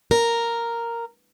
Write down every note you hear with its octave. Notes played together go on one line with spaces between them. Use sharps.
A#4